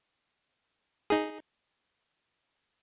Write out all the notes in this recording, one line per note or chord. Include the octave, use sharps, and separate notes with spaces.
D#4 G#4